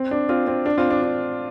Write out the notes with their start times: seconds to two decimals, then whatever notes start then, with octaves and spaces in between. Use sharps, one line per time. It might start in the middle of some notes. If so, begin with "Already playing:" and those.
Already playing: C4
0.11 D4
0.29 C4 F4
0.47 C4
0.66 D4
0.78 C4 F4
0.90 D4
1.02 D4